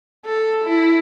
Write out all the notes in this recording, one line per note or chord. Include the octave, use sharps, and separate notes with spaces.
A4
E4